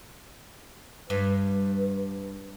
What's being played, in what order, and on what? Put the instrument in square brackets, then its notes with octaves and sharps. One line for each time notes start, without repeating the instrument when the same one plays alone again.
[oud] G2 [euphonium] B4